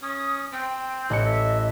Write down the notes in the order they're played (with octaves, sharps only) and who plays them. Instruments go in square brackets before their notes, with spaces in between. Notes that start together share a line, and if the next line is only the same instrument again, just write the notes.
[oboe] C#4 [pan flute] D#6
[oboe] C4 [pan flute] G5
[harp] A1 C#7 [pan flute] D#5
[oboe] E5